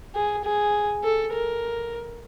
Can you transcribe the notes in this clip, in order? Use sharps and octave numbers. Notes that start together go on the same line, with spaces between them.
G#4
G#4
A4
A#4